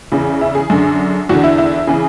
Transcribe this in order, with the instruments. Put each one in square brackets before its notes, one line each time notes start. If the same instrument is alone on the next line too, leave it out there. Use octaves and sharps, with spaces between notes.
[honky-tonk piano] E2 C#3 E3
E4
G#4
F#2 D3
E2 D3 F#4
E4
E4
C#3 E3 G#4